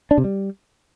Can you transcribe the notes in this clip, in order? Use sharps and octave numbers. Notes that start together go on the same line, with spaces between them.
D4
C3
G3